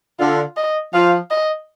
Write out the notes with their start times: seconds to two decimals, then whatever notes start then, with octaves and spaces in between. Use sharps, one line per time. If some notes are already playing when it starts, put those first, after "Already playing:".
0.19 D3 F4
0.57 D#5
0.93 F3 F5
1.31 D#5